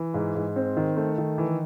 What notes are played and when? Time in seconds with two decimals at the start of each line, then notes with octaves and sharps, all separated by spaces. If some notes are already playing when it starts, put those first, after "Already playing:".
Already playing: E3
0.14 G#2
0.35 G#2
0.56 C4
0.77 D#3
0.97 A3
1.18 D#3
1.38 E3